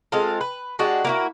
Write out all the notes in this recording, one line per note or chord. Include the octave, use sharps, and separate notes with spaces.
G#3 C4 F4 A4
B4
G#3 D4 F#4 G4
A#3 E4 F#4